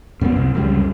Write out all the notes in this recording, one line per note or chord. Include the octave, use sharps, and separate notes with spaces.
F#2 F#3 A3 B3
C2
C#2 F#2 C#3 G3